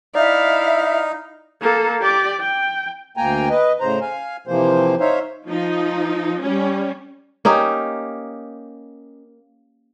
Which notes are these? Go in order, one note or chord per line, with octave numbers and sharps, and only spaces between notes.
D#4 E4 D5 E5 F5
A#3 A4
G4 D5
G5
D2 A#3 G5 G#5 A#5
B4 D#5
A2 C#3 C5 A#5
F5 G#5
C3 E3 F3 A#3 C5
D#4 C5 C#5 E5 F5
F3 D#4
G3 C#4
A#3 C#4 D#4 G4